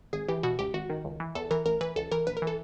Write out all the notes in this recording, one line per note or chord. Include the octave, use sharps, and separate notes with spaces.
G#1 G#4
E3 G4
B2 F#4
C#2 G4
G#1 F#4
D#3
C#2
E3
E2 A4
E3 A#4
A1 A#4
E3 B4
C#2 A4
E3 A#4
A#1 B4
A#4
E3
A4